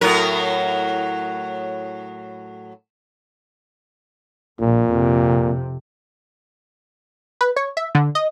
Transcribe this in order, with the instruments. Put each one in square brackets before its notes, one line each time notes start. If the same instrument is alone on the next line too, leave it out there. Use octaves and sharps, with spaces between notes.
[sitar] A2 F#3 A#4
[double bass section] A#1 [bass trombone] A#2
[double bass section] F2 C3
[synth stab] B4
C#5
E5
D3
D#5